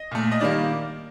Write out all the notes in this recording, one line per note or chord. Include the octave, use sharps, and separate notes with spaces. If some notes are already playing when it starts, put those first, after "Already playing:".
Already playing: D#5
A#2 A3
D#5
D#3 G3 A#3 D5